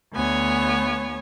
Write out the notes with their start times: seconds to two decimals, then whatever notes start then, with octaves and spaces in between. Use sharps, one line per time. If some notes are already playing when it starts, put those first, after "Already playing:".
0.14 D2 B3 C#5 G#5